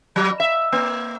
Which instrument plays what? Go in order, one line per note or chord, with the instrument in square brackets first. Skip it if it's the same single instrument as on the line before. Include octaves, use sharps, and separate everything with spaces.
[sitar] F#3
E5
A#3